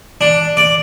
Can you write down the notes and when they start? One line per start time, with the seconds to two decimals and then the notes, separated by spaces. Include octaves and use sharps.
0.21 D4
0.57 D5